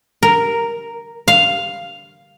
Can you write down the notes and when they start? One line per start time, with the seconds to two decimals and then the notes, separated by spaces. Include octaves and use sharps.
0.23 A#4
1.28 F5